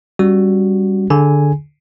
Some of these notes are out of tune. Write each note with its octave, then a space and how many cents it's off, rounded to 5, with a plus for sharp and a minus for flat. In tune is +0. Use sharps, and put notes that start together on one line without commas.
G3 +0 C#4 -10 F#4 +0
D3 +0 G#4 +0 G#5 +0